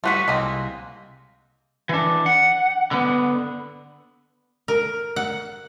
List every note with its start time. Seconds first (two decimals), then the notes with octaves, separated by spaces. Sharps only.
0.04 G3 F4 F#4 B4 E5 F#5
0.28 C2 G#3 A#3 C4
1.89 E3 D4
2.26 F#5
2.91 D3 B3
4.68 A#4
5.16 F#5